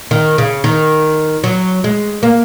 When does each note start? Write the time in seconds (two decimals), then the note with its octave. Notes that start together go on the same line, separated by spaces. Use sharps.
0.11 D#3
0.38 C#3
0.64 D#3
1.44 F#3
1.84 G#3
2.23 A#3